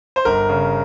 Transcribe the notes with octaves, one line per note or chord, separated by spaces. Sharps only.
C5
G1 A#4
C#3